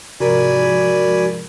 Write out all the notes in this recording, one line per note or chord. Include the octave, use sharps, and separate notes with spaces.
G#2 C3 F3 F#4 A#4 D5 G#5 B5